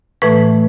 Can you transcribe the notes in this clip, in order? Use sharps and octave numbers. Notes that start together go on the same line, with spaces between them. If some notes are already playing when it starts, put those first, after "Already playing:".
A2 E3 A3 B4